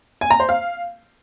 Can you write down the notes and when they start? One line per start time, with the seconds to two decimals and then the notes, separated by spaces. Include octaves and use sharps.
0.21 G#5
0.30 A#5
0.40 C5
0.49 F5